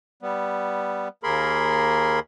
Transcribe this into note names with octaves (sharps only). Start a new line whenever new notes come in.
G3 B3
D#2 A#3 G#4 A#4 B5 C6